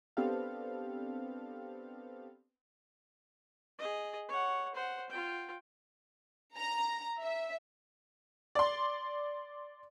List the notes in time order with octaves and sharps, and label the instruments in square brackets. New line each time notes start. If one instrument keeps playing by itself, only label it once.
[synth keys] B3 C4 D4 G4 A4 F5
[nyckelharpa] G#4 D#5
C#5 F#5
C5 F#5
F4 G5
[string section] A#5
E5
[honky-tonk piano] D5 C6